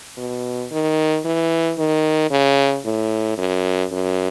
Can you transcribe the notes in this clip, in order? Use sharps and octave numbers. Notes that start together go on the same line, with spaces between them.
B2
D#3
E3
D#3
C#3
A2
F#2
F#2